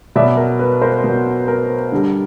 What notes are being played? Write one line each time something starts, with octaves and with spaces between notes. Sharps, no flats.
B2 F#3 D5 E5
A#4
B4
A#4 C5
B2 F#3
A#4
D3 G3